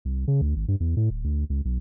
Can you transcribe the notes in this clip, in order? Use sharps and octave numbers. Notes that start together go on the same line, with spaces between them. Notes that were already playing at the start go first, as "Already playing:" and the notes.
C2
C#3
D2
G#1
G2
E2
A2
D1
D2
C#2
B1